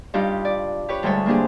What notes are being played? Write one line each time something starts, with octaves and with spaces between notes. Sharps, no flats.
G2 D4 D#4 F4 G4
D5
G4 B4 C#5
D2 G#2 G3 G#4 A4 C#5
A#3 C4 D4 G4 G#4